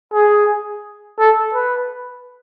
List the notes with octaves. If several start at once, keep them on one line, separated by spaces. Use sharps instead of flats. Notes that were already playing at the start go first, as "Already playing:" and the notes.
G#4
A4
B4